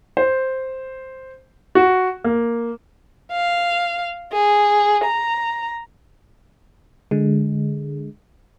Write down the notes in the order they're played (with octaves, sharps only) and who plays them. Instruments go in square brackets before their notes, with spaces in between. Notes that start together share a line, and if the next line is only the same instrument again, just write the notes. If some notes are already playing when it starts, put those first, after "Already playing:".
[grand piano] C5
F#4
A#3
[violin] F5
G#4
A#5
[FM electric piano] D3 G#3